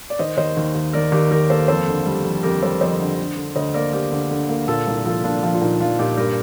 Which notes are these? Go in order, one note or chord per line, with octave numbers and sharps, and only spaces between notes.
D5
D#3 C5 D#5
D#2 C5 D#5
D#2
D#2
D#3 A#4 D5
D#2 G4 A#4
D#2 G4 A#4
A#3 A4 C5
F2 A4 C5
D3
G3
F2
F2 G4 A#4
G3 A4 C5
F2 C5 D#5
D3
D3
D3
D2 C5 D#5
A#3 A#4 D5
A#3 G4 A#4
D3
D3
A#3
A#2 F4 A4
C2
F3 F4 A4
A#2 D4 F4
F3 D4 F4
F4
A#2 D#4
F3 D4 F4
A#2 D#4 G4
G2 G4 A#4